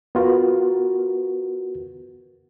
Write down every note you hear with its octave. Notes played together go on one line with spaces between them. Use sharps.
B3 F4 F#4 A#4 B4